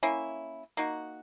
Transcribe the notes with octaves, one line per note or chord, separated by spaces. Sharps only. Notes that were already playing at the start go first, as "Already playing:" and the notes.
A#3 C#4 E4
A#3 D#4 F#4